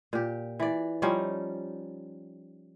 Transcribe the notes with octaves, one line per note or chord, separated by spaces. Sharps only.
A#2 G4
E3 D5
F3 G3 C#4 D#4